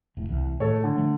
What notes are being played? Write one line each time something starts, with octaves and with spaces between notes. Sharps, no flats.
E1 A#1 A2
C2 E3
A2 D#3 A4 C#5
D3
F3 G3 A3